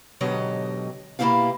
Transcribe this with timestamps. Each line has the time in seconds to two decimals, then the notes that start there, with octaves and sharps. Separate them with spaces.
0.21 G#2 B2 D3 F#3 G4 D#5
1.19 B2 A#3 C4 E4 G4 F5